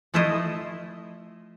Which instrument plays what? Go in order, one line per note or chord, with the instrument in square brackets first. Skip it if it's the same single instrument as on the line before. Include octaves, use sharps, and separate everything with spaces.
[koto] F3 A3 E4 C5 D#5